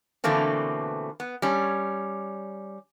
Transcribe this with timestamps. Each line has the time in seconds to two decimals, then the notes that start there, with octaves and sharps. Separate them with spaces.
0.24 B2 D3 E3 A3 A#3 C4
1.20 B3
1.42 G3 C#4